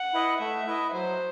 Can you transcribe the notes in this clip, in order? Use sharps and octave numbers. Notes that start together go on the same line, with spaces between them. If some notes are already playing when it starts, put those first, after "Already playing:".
Already playing: F#5
E4 B4 D#5
A3 E5
E4 B4 D#5
F#3 C5